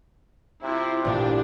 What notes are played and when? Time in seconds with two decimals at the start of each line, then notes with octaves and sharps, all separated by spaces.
0.63 C3 E4 F4
1.05 A1 A#2 D4 G4